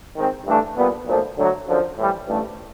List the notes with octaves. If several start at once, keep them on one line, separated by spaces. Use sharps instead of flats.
D#3 G#3 C4
G2 E3 A3 D4
A#2 G3 B3
B1 A#2 F3 A3
D2 D3 F#3
F#2 D3 F3
A2 E3 G3
A1 G2 E3 A3